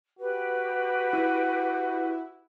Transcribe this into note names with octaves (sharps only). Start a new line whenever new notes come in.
F#4 G4 B4
E4